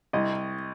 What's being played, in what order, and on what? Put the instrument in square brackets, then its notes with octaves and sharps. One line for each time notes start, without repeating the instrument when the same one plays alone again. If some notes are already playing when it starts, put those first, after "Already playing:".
[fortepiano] C2 D#5